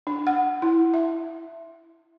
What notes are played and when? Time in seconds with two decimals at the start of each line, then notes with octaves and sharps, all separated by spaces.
0.07 D4
0.27 F#5
0.62 E4
0.94 E5